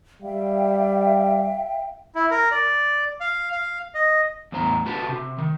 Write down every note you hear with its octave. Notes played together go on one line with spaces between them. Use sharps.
G3 E5 F5 G5
E4
A#4
D5
F5
F5
D#5
E2 A2 C5 A#5
F#4 G4 A4 B4
C3
D#3